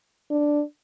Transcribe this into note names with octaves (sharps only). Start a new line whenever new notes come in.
D4